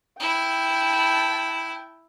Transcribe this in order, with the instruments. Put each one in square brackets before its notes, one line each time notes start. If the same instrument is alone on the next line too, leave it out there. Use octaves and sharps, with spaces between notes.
[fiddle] E4 [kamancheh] G5 A5